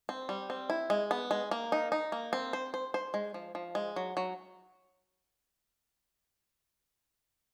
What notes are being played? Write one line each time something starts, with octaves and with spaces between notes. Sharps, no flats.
C4
G3
C4
E4
G#3
B3
G#3
A#3
D#4
D#4
A#3
C4
C5
C5
C5
G#3
F3
F3
G#3
F#3
F#3